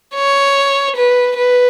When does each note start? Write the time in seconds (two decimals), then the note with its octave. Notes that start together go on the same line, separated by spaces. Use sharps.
0.15 C#5
0.96 B4
1.37 B4